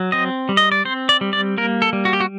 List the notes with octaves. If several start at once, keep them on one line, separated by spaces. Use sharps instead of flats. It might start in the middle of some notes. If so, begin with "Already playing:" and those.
Already playing: F#3
C4 D#5
G3
D#5
D5
C4 C5
D5
G3
D5
A#3 A#4
A4
G3
F#4
G4
F#4